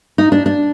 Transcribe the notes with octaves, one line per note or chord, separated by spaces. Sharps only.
D#4
D4
D4